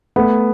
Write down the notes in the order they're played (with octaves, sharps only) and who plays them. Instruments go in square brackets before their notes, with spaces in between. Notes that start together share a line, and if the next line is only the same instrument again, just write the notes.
[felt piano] A3 [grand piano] B3